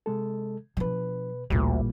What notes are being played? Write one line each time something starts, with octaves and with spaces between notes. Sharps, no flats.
C3 G#3 A4
B2 F3 D4 B4
A1 D2 A#2 G3 A#3